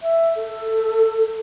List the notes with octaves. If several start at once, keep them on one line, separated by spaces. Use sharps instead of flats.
E5
A4